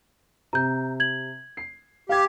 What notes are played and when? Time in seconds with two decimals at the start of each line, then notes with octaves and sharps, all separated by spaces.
0.53 C3 A#5 G6
1.00 G#6 F#7
1.57 C7
2.09 G4 F5 G#6